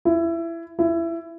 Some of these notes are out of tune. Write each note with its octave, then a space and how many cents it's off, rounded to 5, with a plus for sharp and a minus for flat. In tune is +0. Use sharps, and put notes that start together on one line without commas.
E4 +20
E4 +20